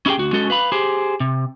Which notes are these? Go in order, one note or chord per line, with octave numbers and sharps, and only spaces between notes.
C#4 E4 G4 G#4 G5
D2 F#4
G#3 C#4 F#4 A4
B4 F5 B5
G4 G#4 C5
C3